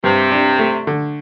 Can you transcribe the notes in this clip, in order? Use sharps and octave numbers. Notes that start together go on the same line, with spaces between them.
G2 C3
D4
A3
D3